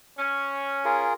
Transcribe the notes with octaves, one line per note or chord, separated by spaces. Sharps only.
C#4
F4 G#4 A#4